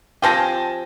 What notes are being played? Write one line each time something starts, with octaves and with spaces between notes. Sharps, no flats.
F3 C4 G4 G#5 A5 A#6